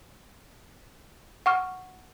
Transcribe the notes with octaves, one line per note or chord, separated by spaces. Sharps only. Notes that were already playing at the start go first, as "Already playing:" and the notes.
F#5 C#6 F6